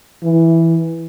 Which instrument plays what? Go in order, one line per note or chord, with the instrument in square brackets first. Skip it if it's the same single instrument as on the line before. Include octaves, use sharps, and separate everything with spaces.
[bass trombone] E3